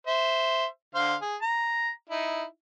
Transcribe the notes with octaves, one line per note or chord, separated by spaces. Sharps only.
C5 E5
D3 C5 F5
G#4
A#5
D#4 E4